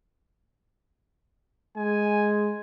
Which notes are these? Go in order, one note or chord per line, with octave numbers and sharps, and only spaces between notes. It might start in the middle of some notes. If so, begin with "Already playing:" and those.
G#3 G#5